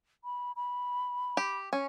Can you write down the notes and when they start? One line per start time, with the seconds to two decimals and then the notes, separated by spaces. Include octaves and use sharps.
0.24 B5
0.56 B5
1.37 G4
1.73 C#4